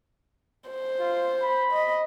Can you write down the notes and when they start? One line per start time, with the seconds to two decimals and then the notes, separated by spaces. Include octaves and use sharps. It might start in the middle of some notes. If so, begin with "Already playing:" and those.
0.69 C5
0.99 F4
1.41 B5
1.72 D#5